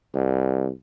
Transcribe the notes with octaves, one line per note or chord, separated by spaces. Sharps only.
C2